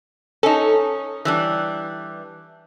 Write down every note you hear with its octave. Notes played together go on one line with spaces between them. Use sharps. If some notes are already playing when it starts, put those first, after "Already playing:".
C#4 D#4 A4
E3 G3 D4